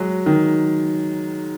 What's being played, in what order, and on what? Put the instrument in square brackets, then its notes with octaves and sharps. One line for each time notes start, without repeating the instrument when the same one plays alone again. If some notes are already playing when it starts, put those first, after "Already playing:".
Already playing: [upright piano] F#3 G#3
D#3